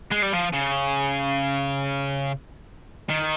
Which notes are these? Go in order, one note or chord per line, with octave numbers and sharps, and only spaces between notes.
G#3
G3
F3
C#3
D#3